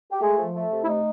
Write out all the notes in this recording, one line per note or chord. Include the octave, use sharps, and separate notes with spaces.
G4
G#3 A3 G#4
F3
A3
C3
E4
A3 D#4